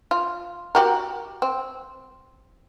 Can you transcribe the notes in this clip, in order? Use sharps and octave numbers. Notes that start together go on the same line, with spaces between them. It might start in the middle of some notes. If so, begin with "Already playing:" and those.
F4
F#4 G4 A#4
C4